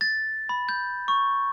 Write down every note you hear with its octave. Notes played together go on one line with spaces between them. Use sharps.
A6
B5
G6
C#6